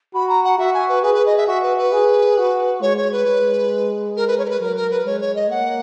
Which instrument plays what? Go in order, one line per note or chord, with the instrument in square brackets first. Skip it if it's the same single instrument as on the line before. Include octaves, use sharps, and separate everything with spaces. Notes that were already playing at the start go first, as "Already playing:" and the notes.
[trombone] F#4 [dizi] B5
[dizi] A#5
F#5
[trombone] F#4 [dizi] E5
[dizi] G#5
B4
[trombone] G#4 [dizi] B4
[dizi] B4
D#5
E5
[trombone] F#4 [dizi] E5
[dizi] B4
B4
[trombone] G#4
F#4
[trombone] G#3 [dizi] C#5
[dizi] C#5
B4
[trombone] G#3
[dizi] A#4
B4
C#5
A#4
B4
[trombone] F#3 [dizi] A#4
[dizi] A#4
B4
[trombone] G#3 [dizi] C#5
[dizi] C#5
D#5
[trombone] A#3 [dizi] F#5